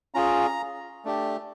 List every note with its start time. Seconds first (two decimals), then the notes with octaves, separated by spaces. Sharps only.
0.14 C#4 F4 G#4 A#5
1.05 A3 D4 G4